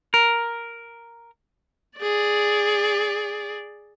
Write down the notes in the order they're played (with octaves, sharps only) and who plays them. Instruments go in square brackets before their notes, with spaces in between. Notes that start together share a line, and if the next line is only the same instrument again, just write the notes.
[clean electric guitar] A#4
[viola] G#4 D5